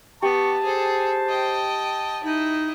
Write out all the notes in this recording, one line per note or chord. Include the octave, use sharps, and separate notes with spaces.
B3 G4 A5 C#6
G#4 A4 C5
D#5 G5
D#4 E4 D#5